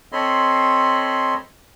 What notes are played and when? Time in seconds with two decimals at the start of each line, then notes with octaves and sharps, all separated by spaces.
0.12 C4 A4 C#5 D#5 B5 C6